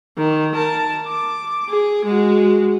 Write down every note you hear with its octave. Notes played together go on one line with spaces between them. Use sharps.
D#3
A#4 A5
D6
G#4
G#3 F#4